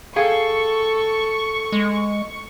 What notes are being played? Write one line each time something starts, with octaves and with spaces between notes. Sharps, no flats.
G#4 A4 F5 G5 C#6
G#3